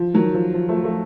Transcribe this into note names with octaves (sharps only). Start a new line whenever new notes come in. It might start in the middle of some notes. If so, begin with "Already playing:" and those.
Already playing: F3
D#3 F#3
F3
F3
F3 A3
F3 A3